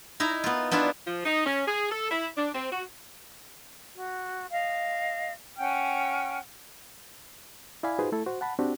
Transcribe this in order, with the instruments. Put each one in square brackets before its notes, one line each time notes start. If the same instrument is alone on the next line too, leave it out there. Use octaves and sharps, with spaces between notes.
[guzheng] D#4 E4 A#5
B3 F4
B3 D4 E4 F4
[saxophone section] F3
D#4
C#4
G#4
A4
E4
D4
C4
F#4
[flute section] F#4
D#5 F5
C#4 F#5 G5 F6
[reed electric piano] E4 D5 F5 G#5 B5
D#4 F4 F#4 G#4 B4 C5
A3 E4 A4
F#4 C5
F#5 A5 B5
C4 D4 F#4 G4